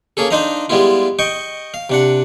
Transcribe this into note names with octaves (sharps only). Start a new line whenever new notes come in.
A#3 C#4 G#4 A4
D4 D#4 C5 D#5 F5 A#5
G3 G#3 B3 E4 F4
D#5 G5 C#6
F5
C3 D4 F#5